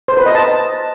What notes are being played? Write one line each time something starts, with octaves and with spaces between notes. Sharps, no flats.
C5
B4
D#5
A5